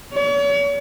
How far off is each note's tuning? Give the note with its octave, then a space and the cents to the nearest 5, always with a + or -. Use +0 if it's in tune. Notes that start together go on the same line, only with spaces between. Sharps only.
C#5 +40